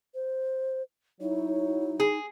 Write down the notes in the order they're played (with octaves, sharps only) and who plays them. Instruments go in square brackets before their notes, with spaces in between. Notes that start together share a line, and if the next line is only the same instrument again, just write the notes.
[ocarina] C5
[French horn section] F#3 E4 C#5 [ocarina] D#4
[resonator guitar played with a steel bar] G#4